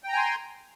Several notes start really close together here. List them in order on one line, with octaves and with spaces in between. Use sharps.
G5 A#5 G#5 C6